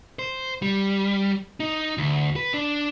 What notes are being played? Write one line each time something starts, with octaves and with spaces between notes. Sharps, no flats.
C5
G3
D#4
D2
B4
D4